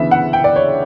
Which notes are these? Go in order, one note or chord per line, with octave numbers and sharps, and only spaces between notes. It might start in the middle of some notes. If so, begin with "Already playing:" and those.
Already playing: D2 C#3 E3 B3 E5
F#5
G5
D5
C#5